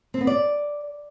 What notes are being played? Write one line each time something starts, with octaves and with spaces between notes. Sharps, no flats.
C4
B3
D5